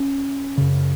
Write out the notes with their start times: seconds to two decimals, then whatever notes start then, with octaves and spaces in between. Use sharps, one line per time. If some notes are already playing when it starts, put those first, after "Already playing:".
Already playing: C#4
0.58 F#2 C#3